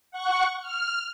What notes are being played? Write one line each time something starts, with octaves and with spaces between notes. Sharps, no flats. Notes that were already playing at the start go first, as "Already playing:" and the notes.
F#5 C#6
F6